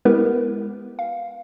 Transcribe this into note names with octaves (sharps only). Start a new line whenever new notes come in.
G#3 B3 E4 G4 A#4 B4
F5